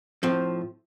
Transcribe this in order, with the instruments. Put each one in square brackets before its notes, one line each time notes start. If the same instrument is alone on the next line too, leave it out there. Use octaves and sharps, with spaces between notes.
[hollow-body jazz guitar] A2 F3 C4